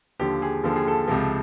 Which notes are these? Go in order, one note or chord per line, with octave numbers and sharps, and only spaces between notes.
D#2 D3 F3 G4
G#4
D#2 D3 F3 A4
G#4
A4
C#2 C3 F3